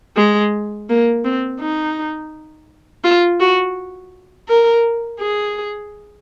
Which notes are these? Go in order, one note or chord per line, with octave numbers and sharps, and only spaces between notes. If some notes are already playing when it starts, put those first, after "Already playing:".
G#3
A#3
C4
D#4
F4
F#4
A#4
G#4